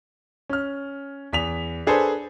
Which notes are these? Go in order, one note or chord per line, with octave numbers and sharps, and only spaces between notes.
C#4 F6
E2 B6 F7
D4 G#4 A4 B4 C5